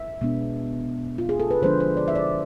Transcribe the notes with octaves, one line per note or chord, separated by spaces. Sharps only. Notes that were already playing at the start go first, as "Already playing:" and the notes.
Already playing: E5
B2 G#3 B3 D4
F4
G#4
A4
B4
D3 F3 G#3 D4 C5
C5
D5
E5
D5